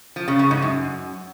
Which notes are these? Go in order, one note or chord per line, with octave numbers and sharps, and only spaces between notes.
F3
C#3
C#3
G#2
F#2